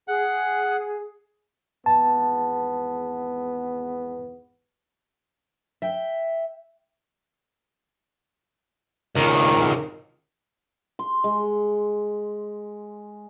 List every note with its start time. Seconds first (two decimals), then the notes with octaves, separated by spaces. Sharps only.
0.08 G#4 F#5
1.86 G#1 E2 B3 A5
5.82 E5 G5
9.15 C#2 D#3
10.99 C6
11.24 G#3